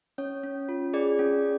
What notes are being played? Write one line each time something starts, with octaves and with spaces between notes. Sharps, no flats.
C#4 C#5
C#4
F4
G#4 D5
C#4